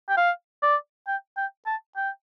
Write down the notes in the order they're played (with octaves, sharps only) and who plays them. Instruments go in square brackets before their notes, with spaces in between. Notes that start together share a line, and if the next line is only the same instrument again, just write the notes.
[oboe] G5
F5
D5
G5
G5
A5
G5